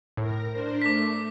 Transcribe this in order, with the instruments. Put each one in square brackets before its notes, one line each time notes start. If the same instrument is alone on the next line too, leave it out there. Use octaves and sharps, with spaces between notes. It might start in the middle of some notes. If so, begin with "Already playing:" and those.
[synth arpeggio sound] A2 [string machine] A#4 A#5
[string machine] D4 A#4 C5
[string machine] A3 [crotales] D6 B6